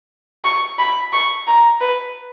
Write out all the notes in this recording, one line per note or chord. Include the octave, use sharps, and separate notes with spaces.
C#6
B5
C#6
A#5
B4